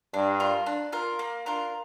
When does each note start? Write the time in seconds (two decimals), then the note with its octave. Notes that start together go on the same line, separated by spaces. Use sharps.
0.14 G2 D4
0.40 F4 A#4
0.66 D4
0.92 F4 A#4
1.19 A#3
1.46 D4 F4 A#4